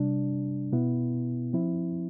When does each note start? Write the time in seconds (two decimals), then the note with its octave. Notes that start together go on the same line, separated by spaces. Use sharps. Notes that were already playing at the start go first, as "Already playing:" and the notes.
Already playing: C3 G3 D4
0.72 B2 B3 E4
1.53 F3 C4 E4